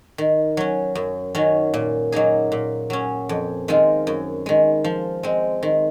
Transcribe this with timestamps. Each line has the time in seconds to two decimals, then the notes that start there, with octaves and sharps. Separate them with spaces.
0.18 D#3
0.57 F#3 C#4
0.95 F#2
1.35 D#3 F#3 C#4
1.74 A#2
2.12 F#3 A#3 D#4 G#4
2.52 A#2
2.90 F#3 C#4
3.29 F2
3.68 D#3 G#3 C4 F4
4.07 F#2
4.46 D#3 G#3
4.84 F3
5.23 G#3 C4
5.63 D#3